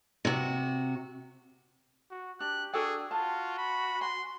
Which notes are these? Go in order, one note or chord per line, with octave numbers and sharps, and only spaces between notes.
C3 F#4
F#4
D4 G4 F#6
D4 F#4 G#4 A4 G5
F4 F#4 A5
B5
G#5 C6